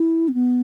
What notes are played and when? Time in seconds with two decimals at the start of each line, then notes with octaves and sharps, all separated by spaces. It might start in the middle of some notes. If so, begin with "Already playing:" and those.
Already playing: E4
0.28 C4
0.34 B3